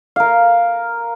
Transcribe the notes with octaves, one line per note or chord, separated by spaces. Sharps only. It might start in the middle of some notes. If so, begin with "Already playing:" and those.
A#4 F5